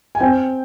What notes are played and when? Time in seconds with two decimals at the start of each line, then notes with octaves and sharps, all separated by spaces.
0.15 G#5
0.20 C4 G5